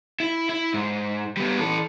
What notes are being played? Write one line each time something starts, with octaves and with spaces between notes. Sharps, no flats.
E4
E4
G#2
G3 B3
E3 A4